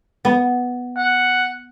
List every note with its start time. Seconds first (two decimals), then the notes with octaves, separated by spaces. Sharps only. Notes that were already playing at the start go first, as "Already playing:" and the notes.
0.25 B3
0.97 F#5